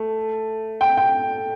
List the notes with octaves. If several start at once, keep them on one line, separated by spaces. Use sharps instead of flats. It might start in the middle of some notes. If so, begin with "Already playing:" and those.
Already playing: A3
G5
G5